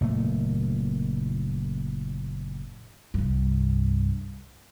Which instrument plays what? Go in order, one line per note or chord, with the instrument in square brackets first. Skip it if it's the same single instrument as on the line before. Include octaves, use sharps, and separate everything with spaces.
[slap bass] F#1 A#2 A3
[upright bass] C2 G2